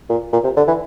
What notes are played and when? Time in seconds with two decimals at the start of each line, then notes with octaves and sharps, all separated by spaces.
0.09 A#2
0.33 A#2
0.44 C3
0.57 D3
0.68 E3